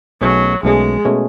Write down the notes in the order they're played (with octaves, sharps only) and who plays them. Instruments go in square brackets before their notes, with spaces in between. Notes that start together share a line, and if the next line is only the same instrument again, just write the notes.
[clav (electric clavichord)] B1 B2 A3 C#4 G#4 [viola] F#3
[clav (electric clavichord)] B1 B2 A3 C#4 G#4 [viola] G#3
[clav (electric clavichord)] B2 A3 C#4 G#4